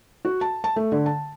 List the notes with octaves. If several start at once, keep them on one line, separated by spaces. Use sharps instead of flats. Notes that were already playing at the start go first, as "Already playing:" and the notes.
F#4
A5
A5
A3
D3
A5